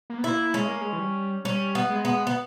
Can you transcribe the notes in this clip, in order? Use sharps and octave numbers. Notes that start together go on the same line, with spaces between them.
A#3
B3
A#3 E4
G#3 C#4
A#3
G#3
E3
G3
G3 C#4
B3
G#3
B3
B3